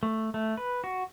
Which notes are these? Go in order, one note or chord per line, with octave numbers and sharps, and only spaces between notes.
A3
A3
B4
F#4